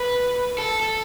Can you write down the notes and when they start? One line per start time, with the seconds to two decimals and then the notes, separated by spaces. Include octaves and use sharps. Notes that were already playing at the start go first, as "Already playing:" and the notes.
Already playing: B4
0.58 A4
0.80 A4